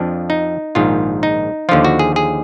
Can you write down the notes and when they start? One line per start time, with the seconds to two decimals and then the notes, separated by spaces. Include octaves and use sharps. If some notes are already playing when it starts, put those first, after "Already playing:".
Already playing: F2 F3 D4
0.30 D#4
0.75 A#1 G#2 D#3 F4
1.23 D#4
1.69 D#2 D3 F3 F4
1.85 F#4
1.99 G#4
2.16 G#4